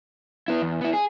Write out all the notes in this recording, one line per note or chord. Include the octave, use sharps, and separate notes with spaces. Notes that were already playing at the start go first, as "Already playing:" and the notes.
B3 E4
E2
B3 E4
G#4